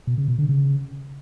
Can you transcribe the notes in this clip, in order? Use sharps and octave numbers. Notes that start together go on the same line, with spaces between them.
B2
C#3
B2
D3
C#3